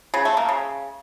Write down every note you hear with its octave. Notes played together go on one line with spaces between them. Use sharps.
C#3
A3
A#3
C#3